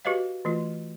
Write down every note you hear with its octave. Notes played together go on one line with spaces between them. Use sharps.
F#4 G4 B4 C#5 D#5 F5
E3 A3 F4